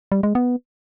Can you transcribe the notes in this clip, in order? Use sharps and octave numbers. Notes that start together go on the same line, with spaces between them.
G3
G#3
B3